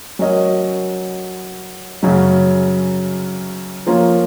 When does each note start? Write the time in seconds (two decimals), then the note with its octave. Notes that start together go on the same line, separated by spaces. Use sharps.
0.19 F#3 C#4 F#4 A#4 D#5
2.02 F#2 C#3 F#3 C#4
3.87 F3 A#3 C#4 F4 A#4